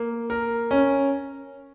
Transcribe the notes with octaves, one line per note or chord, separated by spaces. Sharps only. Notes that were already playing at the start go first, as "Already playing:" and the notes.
Already playing: A#3
A#4
C#4